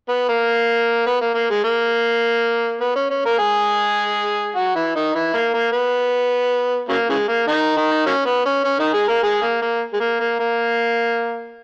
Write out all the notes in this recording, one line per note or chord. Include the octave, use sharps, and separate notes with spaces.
B3
A#3
B3
A#3
A#3
G#3
A#3
B3
C#4
C#4
A#3 A#4
G#3 G#4
F#3 F#4
E3 E4
D#3 D#4
E3 E4
A#3
A#3
B3
C#3 F#3 A#3
C#3 E3 G#3
A#3
D#3 D#4
D#3 D#4
F#3 A#3 C#4
B3
C#4
C#4
D#3 D#4
G#3 G#4
A#3 A#4
G#3 G#4
A#3
A#3
G#3
A#3
A#3
A#3